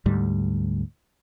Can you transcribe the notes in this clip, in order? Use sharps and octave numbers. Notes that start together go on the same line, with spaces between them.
D2 G#2 G3